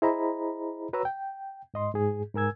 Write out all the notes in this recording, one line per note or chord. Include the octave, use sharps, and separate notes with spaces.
E4 G#4 C5 D#5 A#5 B5
F#4 B4 C#5 A#5 E6
G5
G#2 D#5 C6
G#2 G#4
G#2 A#4 G#5 E6 G#6